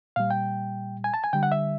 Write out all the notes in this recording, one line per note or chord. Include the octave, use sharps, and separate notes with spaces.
A#2 G3 F5
G5
G#5
A5
G#5
D3 G3 G5
F#5
E5